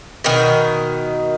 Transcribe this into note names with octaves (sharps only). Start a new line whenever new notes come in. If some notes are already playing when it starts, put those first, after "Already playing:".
B2 D#3